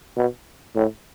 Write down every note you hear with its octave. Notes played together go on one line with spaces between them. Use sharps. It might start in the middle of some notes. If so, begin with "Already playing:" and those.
B2
A2